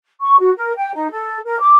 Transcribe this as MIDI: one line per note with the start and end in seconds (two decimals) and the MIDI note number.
0.21 0.37 85
0.38 0.51 66
0.57 0.72 70
0.76 0.91 79
0.94 1.08 63
1.10 1.38 69
1.45 1.59 70
1.60 1.78 86